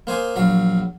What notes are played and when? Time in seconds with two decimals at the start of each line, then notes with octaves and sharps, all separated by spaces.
0.07 A#3 C5 G#5 D#6
0.36 A#1 F#3 F5